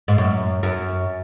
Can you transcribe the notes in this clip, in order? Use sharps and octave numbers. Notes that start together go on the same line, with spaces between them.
G#2
F#2
F#2